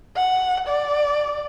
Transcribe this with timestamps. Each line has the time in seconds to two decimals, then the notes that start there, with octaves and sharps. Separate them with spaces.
0.16 F#5
0.67 D5